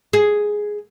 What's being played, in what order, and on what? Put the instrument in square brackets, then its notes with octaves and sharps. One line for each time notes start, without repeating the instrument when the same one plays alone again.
[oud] G#4